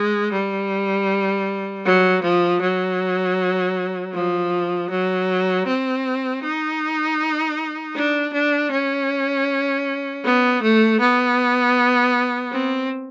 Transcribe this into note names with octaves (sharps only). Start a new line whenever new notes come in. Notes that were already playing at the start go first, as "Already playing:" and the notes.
Already playing: G#3
G3
F#3
F3
F#3
F3
F#3
C4
D#4
D4
D4
C#4
B3
A3
B3
C4